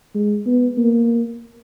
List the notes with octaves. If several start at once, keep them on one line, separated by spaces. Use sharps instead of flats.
G#3
B3
A#3